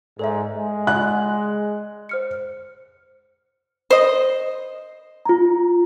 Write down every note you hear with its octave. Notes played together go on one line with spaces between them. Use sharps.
G#2 A4 D5 E5
G#3
D5 F#5 F#6
C5 F6 C#7
C5 D#5
F4 A#5